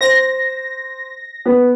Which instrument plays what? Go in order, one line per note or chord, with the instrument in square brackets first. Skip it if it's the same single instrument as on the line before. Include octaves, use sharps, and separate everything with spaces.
[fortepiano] C5 [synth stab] A#6
[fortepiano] B3